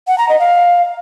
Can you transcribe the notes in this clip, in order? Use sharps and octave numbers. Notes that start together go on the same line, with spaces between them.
F#5
A#5
D#5
F5